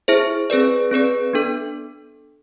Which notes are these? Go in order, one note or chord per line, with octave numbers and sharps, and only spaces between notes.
E4 G#4 C5 E5
C4 G#4 B4 D5
C4 G#4 B4 D5
B3 D4 A4